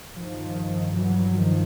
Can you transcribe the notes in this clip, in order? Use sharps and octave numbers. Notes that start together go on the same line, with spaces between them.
G2 D#3 F3
E3 F#3
D#3 F3